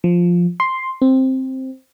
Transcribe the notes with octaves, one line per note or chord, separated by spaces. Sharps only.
F3
C6
C4